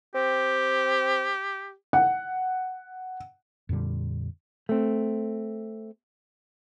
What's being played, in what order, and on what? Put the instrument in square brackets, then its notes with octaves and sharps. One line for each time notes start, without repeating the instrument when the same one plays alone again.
[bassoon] C4 [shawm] G4
[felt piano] F#5
[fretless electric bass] F2 A#2 D3 G3
[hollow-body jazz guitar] A3 C4